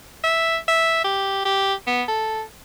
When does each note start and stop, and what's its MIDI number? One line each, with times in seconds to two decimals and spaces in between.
0.24 0.57 76
0.68 1.00 76
1.04 1.43 67
1.45 1.74 67
1.87 2.03 59
2.08 2.43 69